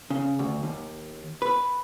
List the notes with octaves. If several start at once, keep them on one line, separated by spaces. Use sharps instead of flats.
C#3
D2
D#2
B4